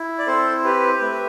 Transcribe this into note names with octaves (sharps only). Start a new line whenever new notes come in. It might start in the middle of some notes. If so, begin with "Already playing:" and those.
Already playing: E4
D5
C4 A4 C5
G4 B4
A3 B4